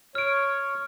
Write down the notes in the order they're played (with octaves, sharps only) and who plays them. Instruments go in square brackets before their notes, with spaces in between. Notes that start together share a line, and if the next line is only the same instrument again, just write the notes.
[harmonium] C#5 [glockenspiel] F6 D7